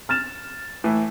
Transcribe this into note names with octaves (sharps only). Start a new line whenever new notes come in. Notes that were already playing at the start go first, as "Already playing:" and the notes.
F6 A6 E7
A2 E3